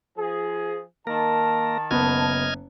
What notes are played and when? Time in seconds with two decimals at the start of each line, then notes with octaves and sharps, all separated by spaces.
0.17 F3 G#4
1.07 D#3 A#3 A#4 A5
1.91 F#1 B3 D#5 F6 G#6